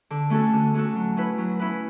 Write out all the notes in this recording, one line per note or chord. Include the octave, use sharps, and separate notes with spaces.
D3
A3 C#4 F#4 A4
D3
A3 C#4 F#4 A4
F#3
C#4 E4 B4
F#3
C#4 E4 B4